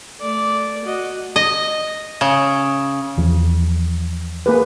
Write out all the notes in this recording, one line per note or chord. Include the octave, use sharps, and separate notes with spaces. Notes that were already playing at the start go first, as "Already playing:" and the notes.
A3 D5
F#4 D#5
D#5
C#3
E2 F3
A#3 G#4 B4